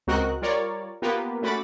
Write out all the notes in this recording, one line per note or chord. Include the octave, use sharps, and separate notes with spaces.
C#2 C4 F#4 A#4 D#5 F#6
G3 F4 A#4 C#5 D5
A#3 B3 F4 G4 A#4 B4
A3 C#4 F#4 B5 D6 A6